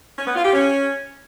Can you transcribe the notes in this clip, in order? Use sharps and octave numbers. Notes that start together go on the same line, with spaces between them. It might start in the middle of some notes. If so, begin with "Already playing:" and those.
C#4
B3
F4
G4
C#4